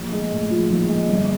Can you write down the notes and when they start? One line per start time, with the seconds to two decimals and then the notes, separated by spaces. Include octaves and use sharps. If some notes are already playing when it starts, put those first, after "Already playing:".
Already playing: A#1
0.12 G#3
0.31 A2
0.50 F3
0.70 A#1
0.89 G#3
1.08 G1